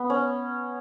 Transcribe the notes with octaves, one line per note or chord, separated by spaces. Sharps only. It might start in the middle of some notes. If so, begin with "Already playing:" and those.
Already playing: B3
C#4